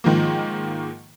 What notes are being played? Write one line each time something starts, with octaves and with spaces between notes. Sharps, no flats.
G#2 D#3 F3 A#3